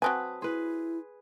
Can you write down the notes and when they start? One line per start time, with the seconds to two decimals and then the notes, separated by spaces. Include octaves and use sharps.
0.02 F#3 C4 B4 G#5 A5 D#6 F#6
0.42 E4 G#4 B4 C6